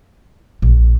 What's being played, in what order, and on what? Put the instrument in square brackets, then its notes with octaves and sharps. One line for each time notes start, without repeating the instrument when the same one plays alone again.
[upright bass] A#1